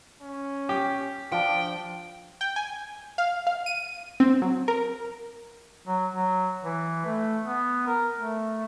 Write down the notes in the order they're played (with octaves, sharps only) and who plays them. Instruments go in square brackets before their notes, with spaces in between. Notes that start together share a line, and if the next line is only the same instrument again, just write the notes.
[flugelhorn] C#4
[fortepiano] G4
[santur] F3 [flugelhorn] D4 [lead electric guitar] G5
[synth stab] G5
G#5
F5
F5
D#7
C4
F#3
A#4
[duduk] F#3
F#3
E3
A3
B3
A#4
A3